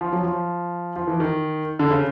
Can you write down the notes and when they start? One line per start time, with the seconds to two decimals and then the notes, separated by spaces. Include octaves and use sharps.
0.01 F3
0.13 F#3
0.23 F3
0.96 F3
1.07 E3
1.20 D#3
1.79 D3
1.91 C#3